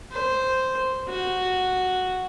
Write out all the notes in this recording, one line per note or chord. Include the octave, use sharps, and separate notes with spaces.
C5
F#4